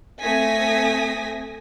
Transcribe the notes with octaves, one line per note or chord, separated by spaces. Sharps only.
A3 C4 G#5 D#6 A#6 B6